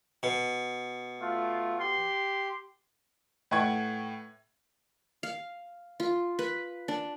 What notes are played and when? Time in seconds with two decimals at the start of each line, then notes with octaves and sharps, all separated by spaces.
0.23 B2
1.21 A3 F4
1.79 G4 C6
3.51 A2 B4 F#5 G5 C#6 G#6
5.23 F5
6.00 F4
6.39 B4
6.88 D4